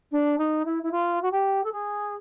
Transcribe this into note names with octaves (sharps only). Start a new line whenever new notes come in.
D4
D#4
E4
E4
F4
F#4
G4
A4
G#4